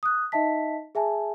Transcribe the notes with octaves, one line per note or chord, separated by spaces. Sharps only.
D#6 F#6
D#4 D#5 E5 A5 B6
G#4 E5 G#5 A5